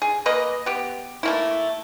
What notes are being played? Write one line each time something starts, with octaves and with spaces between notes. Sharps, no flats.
G#4
A#3 B4 D#5
B3 G4
A3 A#3 E4